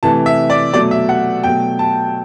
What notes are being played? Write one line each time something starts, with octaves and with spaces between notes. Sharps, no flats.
C3 E3 A3 A5
E5
D5
B2 F#3 A3 D5
E5
F#5
B2 F#3 A3 G5
A5